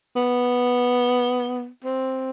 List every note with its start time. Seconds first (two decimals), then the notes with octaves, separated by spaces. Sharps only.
0.16 B3
1.85 C4